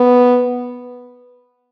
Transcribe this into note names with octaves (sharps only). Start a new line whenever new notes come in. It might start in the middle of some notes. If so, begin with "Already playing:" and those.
Already playing: B3